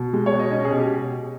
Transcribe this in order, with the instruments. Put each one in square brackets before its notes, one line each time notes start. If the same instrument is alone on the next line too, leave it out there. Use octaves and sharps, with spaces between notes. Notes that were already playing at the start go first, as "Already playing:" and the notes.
Already playing: [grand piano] B2
G#3
C#5
B2
D#5
C#4 D#5
G#4
B2
G4